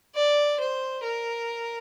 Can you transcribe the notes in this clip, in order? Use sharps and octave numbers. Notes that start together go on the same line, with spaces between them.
D5
C5
A#4